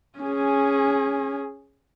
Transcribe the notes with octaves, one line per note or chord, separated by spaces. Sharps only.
C#4 G#4